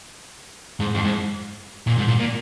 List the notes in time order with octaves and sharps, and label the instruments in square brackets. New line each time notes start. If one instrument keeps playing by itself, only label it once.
[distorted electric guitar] G#2
F2
G#2
A#2
G#2
A#2
A#2